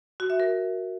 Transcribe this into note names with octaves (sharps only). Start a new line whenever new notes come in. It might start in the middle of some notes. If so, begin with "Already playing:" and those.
F#4
E5
A#4